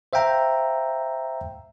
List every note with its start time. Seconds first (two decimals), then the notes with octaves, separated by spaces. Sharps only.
0.13 C5 E5 F5 G5 A#5